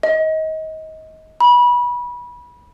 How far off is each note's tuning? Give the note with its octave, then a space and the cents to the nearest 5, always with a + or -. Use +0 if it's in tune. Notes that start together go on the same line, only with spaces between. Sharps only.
D#5 +25
B5 -25